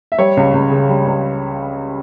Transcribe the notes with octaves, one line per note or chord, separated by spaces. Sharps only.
E5
G3 C#5
C#2
C#2
C#3
G3
C#2